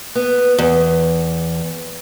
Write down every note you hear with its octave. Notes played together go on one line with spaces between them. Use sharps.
B3
E2